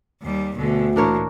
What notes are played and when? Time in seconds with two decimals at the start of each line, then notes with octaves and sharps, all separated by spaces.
0.22 D#2 G3
0.56 D2 B2 D3
0.96 A#2 E3 D4 A#4 C#5